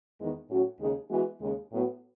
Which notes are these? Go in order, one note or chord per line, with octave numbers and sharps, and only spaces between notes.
E2 D#3 G#3 B3
A2 F#3 C#4 F#4
D#2 C#3 G#3 D#4 G#4
E3 G#3 B3 F#4
D#2 C#3 G#3
A2 F#3 B3 F#4